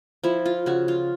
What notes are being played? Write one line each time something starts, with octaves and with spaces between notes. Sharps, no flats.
F3 E4
F4
C#3 F#4
F4